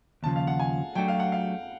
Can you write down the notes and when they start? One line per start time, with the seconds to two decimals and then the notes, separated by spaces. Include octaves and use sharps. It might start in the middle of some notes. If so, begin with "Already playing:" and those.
0.23 D#2 C#3 F3 A5
0.36 F5
0.47 F#5
0.60 G#5
0.95 F#3 A3 D4 F#4 G5
1.08 F5
1.19 F#5
1.32 F5